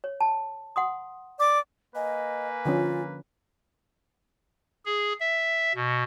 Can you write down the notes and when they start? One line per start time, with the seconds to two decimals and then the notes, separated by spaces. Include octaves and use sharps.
0.04 C#5
0.21 A5
0.76 F#5 C6 D#6
1.39 D5 D6
1.95 A#3 B4 D#5 G#5
2.65 D3 F3 C#4 F4
4.86 G#4
5.20 E5
5.75 B2